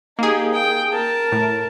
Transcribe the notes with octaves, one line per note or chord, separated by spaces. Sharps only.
A#3 D#4 G4 G#4
G5
A#4 A5
A2